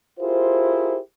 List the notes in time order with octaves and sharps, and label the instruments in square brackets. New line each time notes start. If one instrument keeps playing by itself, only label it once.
[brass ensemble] E4 F4 G4 G#4 A#4 C5